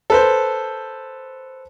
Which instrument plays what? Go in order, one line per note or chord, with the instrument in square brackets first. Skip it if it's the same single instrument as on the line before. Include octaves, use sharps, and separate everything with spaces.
[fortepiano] A4 B4 C5